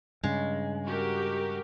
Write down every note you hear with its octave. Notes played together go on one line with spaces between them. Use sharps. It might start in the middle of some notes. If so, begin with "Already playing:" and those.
G2 C#3 G#3
F#4 G4 A#4